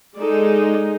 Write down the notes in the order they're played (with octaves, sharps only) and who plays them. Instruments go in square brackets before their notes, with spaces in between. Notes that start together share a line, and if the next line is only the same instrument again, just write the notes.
[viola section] G#3 D#4 [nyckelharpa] A4 D5